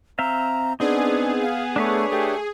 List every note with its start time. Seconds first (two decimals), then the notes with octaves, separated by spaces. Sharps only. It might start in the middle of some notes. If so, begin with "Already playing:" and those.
0.19 C4 E5 F5 A#5
0.80 B3 C4 D4 D#4 G#4
1.42 F5
1.76 A3 D4 B4 C#5
2.11 A3 G4